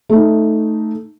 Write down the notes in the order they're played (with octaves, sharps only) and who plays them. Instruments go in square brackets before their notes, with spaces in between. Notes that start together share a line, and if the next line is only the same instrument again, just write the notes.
[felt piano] A3 D#4